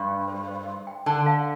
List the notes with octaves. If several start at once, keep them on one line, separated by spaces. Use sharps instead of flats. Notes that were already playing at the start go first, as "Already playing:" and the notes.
Already playing: G2 C6
G5
C5
C5
C6
G5
D3 A5
F5